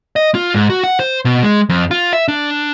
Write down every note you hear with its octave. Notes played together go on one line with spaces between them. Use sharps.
D#5
F4
G#2
F#4
F#5
C5
B2
G#3
F2
F4
E5
D4